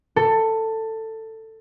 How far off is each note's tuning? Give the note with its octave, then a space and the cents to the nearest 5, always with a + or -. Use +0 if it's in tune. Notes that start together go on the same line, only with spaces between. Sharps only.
A4 +15